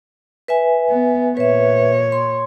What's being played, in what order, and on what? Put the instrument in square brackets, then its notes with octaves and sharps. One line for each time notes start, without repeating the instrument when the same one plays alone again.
[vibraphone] B4 E5 G#5
[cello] B3
[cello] A#2 C#5 [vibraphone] B4 E5
[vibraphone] C6